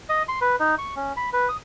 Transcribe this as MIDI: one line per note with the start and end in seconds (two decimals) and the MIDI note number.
0.09 0.23 75
0.28 0.39 84
0.41 0.56 71
0.60 0.75 63
0.78 0.95 85
0.96 1.13 61
1.17 1.30 83
1.33 1.49 71
1.49 1.57 87